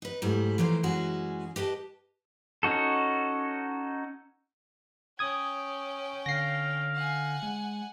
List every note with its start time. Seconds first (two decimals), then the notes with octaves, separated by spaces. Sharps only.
0.02 D#4 B4
0.22 G#2 F#3 G3 A3 E4
0.58 E3 F3 A3 A#3 C5
0.83 F#2 E3 G#3 C#4 F#4 G#4
1.56 G4 B4 D#5 A5
2.63 C#4 D#4 F#4 A4
5.19 C#4 G5 D#6 G#6
6.26 D3 F5 A#6 C7
6.95 F#5 G#5
7.43 G#3